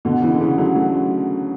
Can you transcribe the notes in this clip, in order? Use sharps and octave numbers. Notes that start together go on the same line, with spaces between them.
B2 D3
C#3 E3
D3
C#3 E3
D3 F#3
F#3 A3